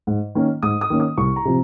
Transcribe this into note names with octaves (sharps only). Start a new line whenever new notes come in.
G#2
D#3 A#3 C#4
G#2 D#6
D#6
D#3 A#3 C#4
D#6
C2 C#6
A#5
C3 F3 C4